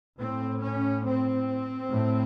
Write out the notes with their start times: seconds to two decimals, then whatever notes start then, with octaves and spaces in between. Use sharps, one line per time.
0.19 A2 C4
0.63 C#4
1.05 C4
1.90 A2